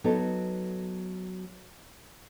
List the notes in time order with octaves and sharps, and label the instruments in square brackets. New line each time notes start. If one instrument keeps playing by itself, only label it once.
[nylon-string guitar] F#3 B3 D#4 A4